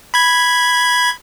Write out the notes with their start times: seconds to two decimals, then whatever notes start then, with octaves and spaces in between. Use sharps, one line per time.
0.14 B5 G#6